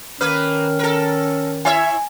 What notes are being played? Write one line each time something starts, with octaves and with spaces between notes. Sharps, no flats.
D#3 A#3 C#4 B4 F6
A4 A#4
E4 C#5 E5 G#5